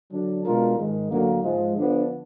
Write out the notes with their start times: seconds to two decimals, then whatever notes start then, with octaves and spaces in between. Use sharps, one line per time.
0.12 D3 F#3 D4
0.45 B2 G#3 D4 F4 A#4
0.77 G#2 D#3 G#3
1.10 D2 D3 F#3 A#3
1.44 G#2 F3 G#3
1.75 D3 F3 B3 D4